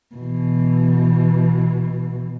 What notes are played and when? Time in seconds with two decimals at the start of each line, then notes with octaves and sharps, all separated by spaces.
0.16 B2 E3